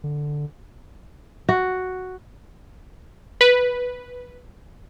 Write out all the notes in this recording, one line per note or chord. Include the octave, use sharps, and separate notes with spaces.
D3
F#4
B4